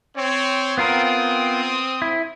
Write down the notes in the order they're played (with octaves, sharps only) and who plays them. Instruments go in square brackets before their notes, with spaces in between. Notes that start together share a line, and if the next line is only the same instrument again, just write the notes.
[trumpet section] C4 C#5
[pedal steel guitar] B3 F4 A#4 [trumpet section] C4 D#6
[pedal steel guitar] E4